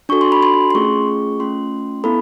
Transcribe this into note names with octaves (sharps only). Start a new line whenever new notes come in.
D4 F#4 A4 C#6
C6
B5
C6
C6
A3 C#4 F4 G#4 C#6
A3 C#4 F4 C6
B3 E4 A4 B5